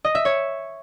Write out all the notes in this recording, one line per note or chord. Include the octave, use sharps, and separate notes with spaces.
D#5
E5
C#5